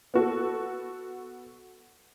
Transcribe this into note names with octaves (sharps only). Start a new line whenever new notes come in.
B3 F#4 A4